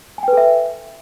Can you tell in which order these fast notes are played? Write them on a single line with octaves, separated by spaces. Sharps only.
G#5 G5 B4 A4 E5